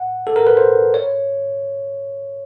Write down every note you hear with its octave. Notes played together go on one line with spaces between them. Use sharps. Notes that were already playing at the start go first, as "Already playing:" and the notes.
Already playing: F#5
A4
A#4
B4
C5
C#5